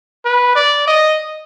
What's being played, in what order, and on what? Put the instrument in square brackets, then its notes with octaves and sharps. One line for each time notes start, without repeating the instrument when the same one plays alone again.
[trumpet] B4
D5
D#5